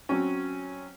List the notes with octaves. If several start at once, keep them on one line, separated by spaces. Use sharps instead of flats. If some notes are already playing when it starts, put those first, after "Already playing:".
F#3 C4 C#4